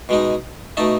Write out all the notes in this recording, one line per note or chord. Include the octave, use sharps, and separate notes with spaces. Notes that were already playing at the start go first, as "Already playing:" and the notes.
B2 G#3 D#4
B2 A3 D#4 A5